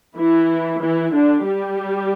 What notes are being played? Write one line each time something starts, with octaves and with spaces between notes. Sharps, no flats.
E3 E4
E3 E4
D3 D4
G3 G4